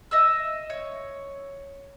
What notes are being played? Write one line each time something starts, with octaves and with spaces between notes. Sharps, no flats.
D#5 E5 E6
C#5